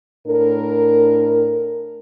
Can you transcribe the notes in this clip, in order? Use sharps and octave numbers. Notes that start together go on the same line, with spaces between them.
A2 D4 A#4